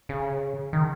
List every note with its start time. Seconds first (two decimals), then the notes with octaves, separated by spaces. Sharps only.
0.09 C#3
0.73 D#3